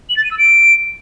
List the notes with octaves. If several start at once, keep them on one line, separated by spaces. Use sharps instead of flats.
F#7
A6
D#7
E6
D7